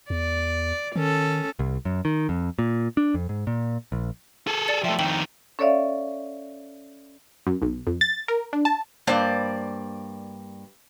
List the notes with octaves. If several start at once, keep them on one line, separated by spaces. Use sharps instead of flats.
E2 D5
D#3 C#4 A4
C2
F#2
D#3
F2
A#2
D4
F2
G#2
A#2
A#1
G#4 A4
D5 A6 C#7
F3 A3 E5 G5 A5
F2 D#3 G5 F#7
C#4 A4 C#5 D5 E5 F5
F#2
B1
F2
A6
A#4
D4
A5
G2 A#3 C5 D5